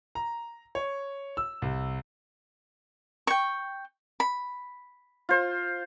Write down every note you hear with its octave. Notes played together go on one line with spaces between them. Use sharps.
A#5
C#5
E6
C2
G5 C#6
B5
F4 C5